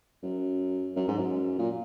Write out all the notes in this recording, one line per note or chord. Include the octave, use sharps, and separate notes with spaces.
F#2
F#2
G#2
F#2
A#2